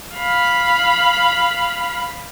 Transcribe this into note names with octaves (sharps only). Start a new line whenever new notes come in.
F5 B5